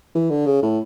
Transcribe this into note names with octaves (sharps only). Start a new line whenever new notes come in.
E3
D3
C#3
A2